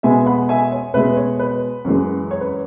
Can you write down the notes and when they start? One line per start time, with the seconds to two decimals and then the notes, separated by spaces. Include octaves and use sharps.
0.03 B2 G#3 B3 E5 G#5
0.26 F#5 B5
0.49 E5 G#5
0.72 C#5
0.94 B2 G#3 B3 B4 E5
1.17 C#5
1.39 B4
1.85 F#2 E3 G#3
2.31 C#5
2.41 B4